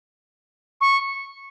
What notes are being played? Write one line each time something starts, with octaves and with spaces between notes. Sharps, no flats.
C#6